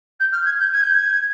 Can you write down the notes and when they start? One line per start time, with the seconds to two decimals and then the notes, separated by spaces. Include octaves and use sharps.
0.20 G6
0.32 F6
0.45 G#6
0.59 G6
0.73 G#6
0.83 G6
0.94 G#6